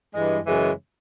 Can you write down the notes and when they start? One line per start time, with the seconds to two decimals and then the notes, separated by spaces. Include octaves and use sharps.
0.14 G2 E3 G#3
0.46 F#2 C#3 E3 G#3